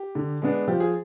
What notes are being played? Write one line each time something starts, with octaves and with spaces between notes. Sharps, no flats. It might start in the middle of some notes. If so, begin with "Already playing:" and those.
Already playing: G4
D3
G#3 B3 D4
F3 G4
G#4